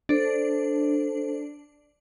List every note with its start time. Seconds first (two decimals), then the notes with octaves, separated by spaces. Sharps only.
0.09 D4 A4 C5